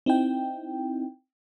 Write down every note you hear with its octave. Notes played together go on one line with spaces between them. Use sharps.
C4 D#4 E4 G5